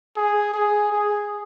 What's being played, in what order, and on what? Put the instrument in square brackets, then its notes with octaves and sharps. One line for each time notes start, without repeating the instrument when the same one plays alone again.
[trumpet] G#4
G#4
G#4